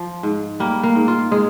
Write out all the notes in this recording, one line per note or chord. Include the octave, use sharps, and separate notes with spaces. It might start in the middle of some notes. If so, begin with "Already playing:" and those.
Already playing: F3
G#2
G3 A#3
A#3
G#2
F4
G#3 G#4